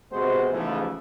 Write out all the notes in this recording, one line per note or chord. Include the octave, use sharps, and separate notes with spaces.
C3 G#3 B3 F#4 C5
A1 G#2 C#3 E3 F3 A3